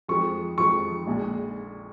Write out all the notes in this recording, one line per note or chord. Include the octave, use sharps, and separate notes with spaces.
F2 F3 G#3 C#6
F2 F3 G#3 C#6
A#1 A#2 G#3